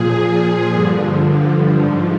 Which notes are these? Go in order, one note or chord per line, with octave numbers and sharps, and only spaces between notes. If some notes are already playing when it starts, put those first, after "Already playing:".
Already playing: A#2 F3 G#4
G2 D3 F3
G#2 F3